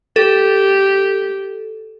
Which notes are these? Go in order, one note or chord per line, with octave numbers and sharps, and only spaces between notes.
G4 A4